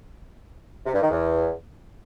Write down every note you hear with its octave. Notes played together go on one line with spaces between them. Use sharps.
C3
G2
D#3
E2